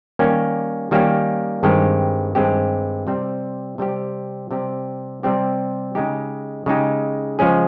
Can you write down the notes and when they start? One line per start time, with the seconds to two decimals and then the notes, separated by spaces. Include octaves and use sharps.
0.19 D#3 G3 A#3 C#4 G4
0.91 D#3 G3 A#3 C#4 G4
1.63 G2 D#3 G#3 C4 G4
2.35 G2 D#3 G#3 C4 G4
3.07 C3 G3 C4 G4
3.78 C3 G3 C4 G4
4.51 C3 G3 C4 G4
5.23 C3 G3 C4 G4
5.95 C#3 G#3 D#4 G4
6.66 C#3 G#3 D#4 G4
7.39 C#3 F3 G#3 C#4 G#4